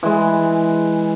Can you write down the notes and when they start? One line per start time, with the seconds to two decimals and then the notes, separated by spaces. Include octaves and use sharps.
0.03 E3 G#3